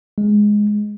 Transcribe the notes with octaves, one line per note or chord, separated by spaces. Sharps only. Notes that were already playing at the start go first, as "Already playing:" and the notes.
G#3